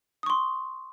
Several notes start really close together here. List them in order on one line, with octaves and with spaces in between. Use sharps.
D#6 C#6 C6